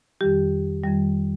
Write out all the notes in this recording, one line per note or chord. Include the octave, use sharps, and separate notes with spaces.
F2 D#3 G3 G4
F2 D#3 G3